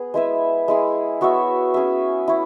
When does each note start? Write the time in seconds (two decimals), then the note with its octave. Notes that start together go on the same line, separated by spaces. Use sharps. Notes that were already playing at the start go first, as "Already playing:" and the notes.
Already playing: B3 G#4
0.14 G#3 E4 B4 E5
0.68 G#3 E4 G#4
1.21 B3 F#4 C#5 E5
1.74 C#4 G#4 E5
2.28 E4 C#5